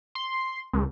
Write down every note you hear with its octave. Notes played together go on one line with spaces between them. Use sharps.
C6
C#2